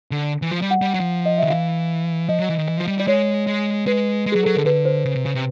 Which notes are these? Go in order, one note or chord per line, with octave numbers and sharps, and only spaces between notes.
D3
E3
F3
G3
F#5
G3
F#3
F3
D#5
D#3 E5
E3 F5
F3 D#5
F#3
E3
D#3
E3
F3
G3
G3 D5
G#3 C#5
G#3
G#3 B4
G#3
F#3 G#4
F#3 A4
D3 A#4
D3 B4
C5
C#3
C3
C#3
C3